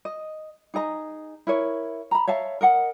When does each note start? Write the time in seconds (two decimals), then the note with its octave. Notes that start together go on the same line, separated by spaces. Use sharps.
0.05 D#5
0.74 D#4 G#4 D#5 A#5
1.47 E4 A#4 C#5
2.11 A#5 B5
2.27 C#5 E5 F5 A5
2.61 A#4 D#5 F#5